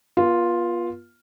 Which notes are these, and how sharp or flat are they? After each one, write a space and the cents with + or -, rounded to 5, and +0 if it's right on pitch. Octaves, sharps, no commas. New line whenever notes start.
B3 -40 F4 +0